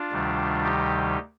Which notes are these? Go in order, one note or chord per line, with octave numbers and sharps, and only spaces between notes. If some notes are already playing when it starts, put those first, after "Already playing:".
Already playing: D4 F4
D2 C3 D#3 G3
D#4 G4